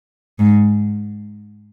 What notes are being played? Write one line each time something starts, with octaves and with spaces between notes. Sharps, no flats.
G#2